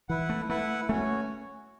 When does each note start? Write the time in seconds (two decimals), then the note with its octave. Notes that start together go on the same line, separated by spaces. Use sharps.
0.09 E3 E4 B4 F#5
0.29 A3
0.49 A3 E4 B4 F#5
0.89 A3 C#4 F#4 C#5